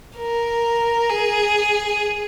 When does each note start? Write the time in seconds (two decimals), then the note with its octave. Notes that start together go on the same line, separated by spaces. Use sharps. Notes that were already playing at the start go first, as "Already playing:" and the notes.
0.17 A#4
1.09 G#4